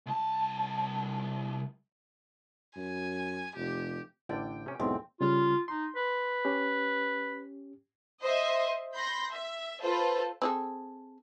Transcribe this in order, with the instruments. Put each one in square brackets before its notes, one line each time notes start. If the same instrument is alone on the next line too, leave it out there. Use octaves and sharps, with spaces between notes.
[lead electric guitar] C2 A5
[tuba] F#2 [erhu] G#5
[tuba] F1 [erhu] G4
[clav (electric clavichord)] A1 D3 D5 [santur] G5
[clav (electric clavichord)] C3 C#4
[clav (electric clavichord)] B1 E2 G#2 [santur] C4
[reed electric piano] C#3 G3 F6 [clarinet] F4
[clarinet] D#4 [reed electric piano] C6
[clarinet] B4
[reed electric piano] C#4 G4
[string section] C5 D#5 E5
B5 C6 G6 A#6
E5
F4 A4 B4 C5
[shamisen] C4 G#4 A4